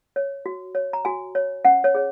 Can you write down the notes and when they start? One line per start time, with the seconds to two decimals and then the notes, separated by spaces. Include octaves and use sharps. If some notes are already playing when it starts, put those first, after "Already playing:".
0.16 C#5
0.46 F#4
0.75 C#5
0.93 A#5
1.05 F#4 G#5
1.35 C#5
1.65 C#4 F#5
1.84 C#5
1.95 G#4 C#5